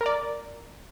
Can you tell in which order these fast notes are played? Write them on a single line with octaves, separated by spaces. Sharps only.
A#4 A#5 D5